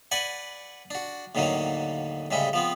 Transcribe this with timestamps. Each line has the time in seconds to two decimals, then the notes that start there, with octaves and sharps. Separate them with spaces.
0.11 B4 D5 F#5 G#5
0.91 D4 F#4
1.35 D#2 A2 D3 D#3 F#3 A#3
2.31 A2 C#3 G3 G#3 E4
2.53 F3 B3 C4